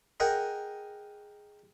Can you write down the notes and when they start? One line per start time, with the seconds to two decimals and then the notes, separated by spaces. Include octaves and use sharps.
0.20 G#4 A#4 D#5 F#5 G5